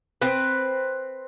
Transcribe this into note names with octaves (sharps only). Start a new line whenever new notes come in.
C4 B4